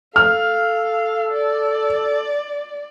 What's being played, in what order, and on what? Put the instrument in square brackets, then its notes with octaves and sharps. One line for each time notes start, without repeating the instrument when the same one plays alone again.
[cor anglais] A4 [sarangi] F5 [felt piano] F6
[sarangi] D5